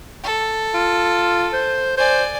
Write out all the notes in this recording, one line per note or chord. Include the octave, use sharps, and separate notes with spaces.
A4
F4
C5
C5 D5 G#5